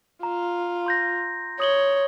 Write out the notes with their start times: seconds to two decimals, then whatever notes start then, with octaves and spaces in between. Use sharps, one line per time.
0.23 F4 A#5
0.86 C6 G6 A#6
1.60 C#5 D#6 F#7 G7